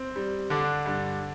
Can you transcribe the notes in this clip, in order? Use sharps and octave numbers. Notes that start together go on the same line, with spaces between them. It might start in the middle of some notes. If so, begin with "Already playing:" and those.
Already playing: C4
G3
D3 D4
G2